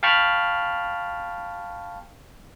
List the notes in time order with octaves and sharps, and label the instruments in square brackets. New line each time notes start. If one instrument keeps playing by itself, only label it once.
[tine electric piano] F5 G5 A5 B5 C#6 F6